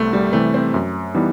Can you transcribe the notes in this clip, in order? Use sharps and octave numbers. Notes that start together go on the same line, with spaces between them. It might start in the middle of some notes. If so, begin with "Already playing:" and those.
Already playing: C2 A3 B3
G3
C3 E3 A3
C4
F#2
E3 G3 B3 D#4